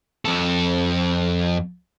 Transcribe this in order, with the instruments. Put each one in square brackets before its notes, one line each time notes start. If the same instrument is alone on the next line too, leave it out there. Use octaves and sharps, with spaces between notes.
[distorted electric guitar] F2 A4